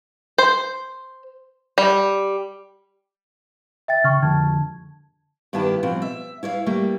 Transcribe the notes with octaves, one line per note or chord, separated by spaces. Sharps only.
C5
G3
E5 G5 A6
C#3 G5 C#6 F6
F2 D3 A5 G#6
G2 D#3 B3 E4 G4 A5
B2 F3 C4
E5
E4 C#5 D5 F5
G3 A3 A#3